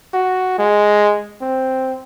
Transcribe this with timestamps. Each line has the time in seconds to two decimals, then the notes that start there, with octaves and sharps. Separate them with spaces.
0.13 F#4
0.58 G#3
1.41 C4